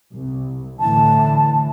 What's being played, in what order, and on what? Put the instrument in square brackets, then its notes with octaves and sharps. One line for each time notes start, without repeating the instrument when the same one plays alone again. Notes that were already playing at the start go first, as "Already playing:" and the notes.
[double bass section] C2
[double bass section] A2 D3 E3 [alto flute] A5